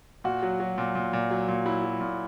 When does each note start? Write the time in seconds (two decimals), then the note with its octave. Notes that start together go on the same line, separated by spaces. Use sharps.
0.24 A#2 F#4
0.43 F#3
0.60 F#3
0.78 A#2
0.95 A#2
1.13 A#2
1.31 F#3
1.48 A#2
1.66 F#3 E4
1.84 F#3
2.01 A#2